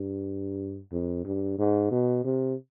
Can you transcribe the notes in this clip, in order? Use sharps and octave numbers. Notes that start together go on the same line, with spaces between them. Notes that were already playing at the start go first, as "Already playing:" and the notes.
Already playing: G2
F2
G2
G#2
B2
C3